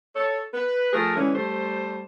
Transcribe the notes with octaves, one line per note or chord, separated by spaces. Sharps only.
A4 C#5
B4
F3 A3 G#4 A#4
D3 E3 G#3 C#4
G3 A3 C5